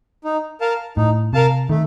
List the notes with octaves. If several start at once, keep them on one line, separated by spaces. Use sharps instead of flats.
D#4
A#4 F5 A5
A2 D#4
C3 A#4 F5 A5
D#3 A3